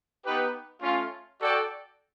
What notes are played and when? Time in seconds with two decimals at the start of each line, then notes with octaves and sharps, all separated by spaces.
0.25 B3 D#4 G4 B4
0.82 A3 C#4 F4
1.40 F#4 A4 D5 G5